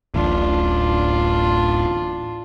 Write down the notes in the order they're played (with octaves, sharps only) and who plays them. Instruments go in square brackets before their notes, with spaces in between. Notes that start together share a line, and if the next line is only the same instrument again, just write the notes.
[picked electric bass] D1 A1 [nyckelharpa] D4 F4